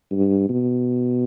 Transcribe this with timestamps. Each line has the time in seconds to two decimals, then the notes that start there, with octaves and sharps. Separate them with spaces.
0.12 G2
0.49 B2